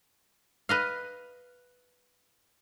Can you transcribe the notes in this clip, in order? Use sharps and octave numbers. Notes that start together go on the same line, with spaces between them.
B4 D#5 F5